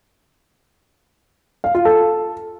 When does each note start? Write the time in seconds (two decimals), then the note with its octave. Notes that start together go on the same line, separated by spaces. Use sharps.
1.64 F5
1.75 F4
1.85 A4